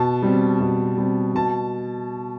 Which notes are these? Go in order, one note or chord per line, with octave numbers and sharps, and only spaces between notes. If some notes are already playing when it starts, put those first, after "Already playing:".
Already playing: B2 A5
G3 C4
B2
G3 C4
B2 A5